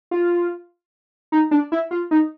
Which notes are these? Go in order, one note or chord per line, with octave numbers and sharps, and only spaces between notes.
F4
D#4
D4
E4
F4
D#4